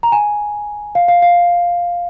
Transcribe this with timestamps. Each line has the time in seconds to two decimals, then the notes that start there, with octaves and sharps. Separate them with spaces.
0.03 A#5
0.12 G#5
0.95 F5
1.08 F5
1.22 F5